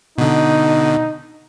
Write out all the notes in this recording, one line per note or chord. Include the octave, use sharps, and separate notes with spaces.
B2 D3 D#4